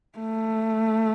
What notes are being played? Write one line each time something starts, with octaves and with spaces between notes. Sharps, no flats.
A3